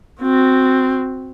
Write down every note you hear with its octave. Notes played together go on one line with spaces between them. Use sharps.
C4 F#4